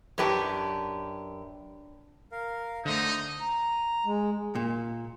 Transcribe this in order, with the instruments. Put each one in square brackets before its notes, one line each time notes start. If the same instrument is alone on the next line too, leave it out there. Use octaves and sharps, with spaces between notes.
[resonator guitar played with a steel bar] F#2 G4 [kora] D4 B4 C#5
[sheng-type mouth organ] A#4 F5
[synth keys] D3 A3 [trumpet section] D#4 D#5 [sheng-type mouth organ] C5
[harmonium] A#5
G#3
[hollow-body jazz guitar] A#2